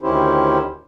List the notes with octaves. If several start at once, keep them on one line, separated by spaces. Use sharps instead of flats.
D2 D#3 C#4 E4 G4 C5